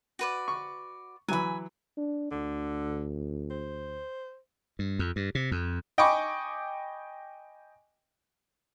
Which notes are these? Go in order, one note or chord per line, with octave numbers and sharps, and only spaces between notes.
F#4 B4 D5
C#6
E3 F#3 G#5 B5
D4
D2 D3
C5
G2
F2
G2
C3
F2
D#5 G5 G#5 B5 C#6 D6